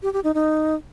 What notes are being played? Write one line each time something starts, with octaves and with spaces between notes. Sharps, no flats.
G4
G4
D#4
D#4